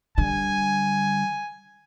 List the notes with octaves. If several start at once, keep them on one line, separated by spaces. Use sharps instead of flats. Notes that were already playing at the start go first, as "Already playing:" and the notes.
D3 G3 G#5